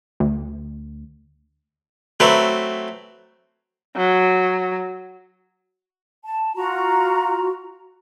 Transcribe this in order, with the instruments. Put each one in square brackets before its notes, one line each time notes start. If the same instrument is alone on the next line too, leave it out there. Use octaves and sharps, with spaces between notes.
[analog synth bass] D2
[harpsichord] F#3 A3 C4 B4
[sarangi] F#3
[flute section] A5
F4 F#4 A#5